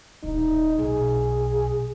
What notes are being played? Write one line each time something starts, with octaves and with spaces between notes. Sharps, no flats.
D1 A#2 D#4
B1 A#2 G#4